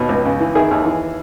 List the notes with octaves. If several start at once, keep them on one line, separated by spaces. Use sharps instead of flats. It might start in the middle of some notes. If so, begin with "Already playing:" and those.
Already playing: D#2 B2
C#2
C#3
E3
D#3 E4 G#4
D#2
E3